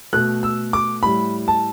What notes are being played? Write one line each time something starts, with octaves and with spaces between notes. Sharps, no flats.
B2 A3 F#6
E6
D6
A2 G3 B5
A5